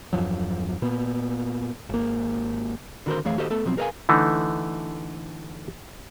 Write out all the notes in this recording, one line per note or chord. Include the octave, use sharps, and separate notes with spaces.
E2 G2 F3 F#3
A#2 B3
G#1 A#3
D3 D#3 F#4 A4 A#4 C5
F2 E3 A3 G#4 C#5 F5
D#2 F#4 G4 A4 C5 D#5
A3 B3 A4
B2 F3 F#3 A3 C4
G#4 A#4 B4 D5 F5 G#5
D3 E3 A3 D#4